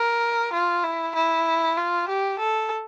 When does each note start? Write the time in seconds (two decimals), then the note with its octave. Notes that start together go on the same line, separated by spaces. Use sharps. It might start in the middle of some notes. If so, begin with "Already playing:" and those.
Already playing: A#4
0.53 F4
0.84 E4
1.15 E4
1.77 F4
2.08 G4
2.39 A4